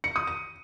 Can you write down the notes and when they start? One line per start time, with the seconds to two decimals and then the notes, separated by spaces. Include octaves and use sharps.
0.04 C#7
0.16 D#6
0.27 D#7